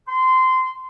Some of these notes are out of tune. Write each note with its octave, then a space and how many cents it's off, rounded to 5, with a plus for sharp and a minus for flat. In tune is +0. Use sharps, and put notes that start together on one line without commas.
C6 -20